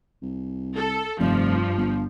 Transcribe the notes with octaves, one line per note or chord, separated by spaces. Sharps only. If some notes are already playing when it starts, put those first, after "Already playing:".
C2
A4
F1 G2 F3
G1